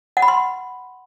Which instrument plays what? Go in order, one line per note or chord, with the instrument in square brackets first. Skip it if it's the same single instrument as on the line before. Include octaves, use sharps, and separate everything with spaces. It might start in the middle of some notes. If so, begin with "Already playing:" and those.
[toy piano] F#5
B5
C6